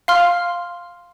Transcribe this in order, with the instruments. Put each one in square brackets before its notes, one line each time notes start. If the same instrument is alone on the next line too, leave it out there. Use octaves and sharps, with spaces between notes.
[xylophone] F5 C6 F6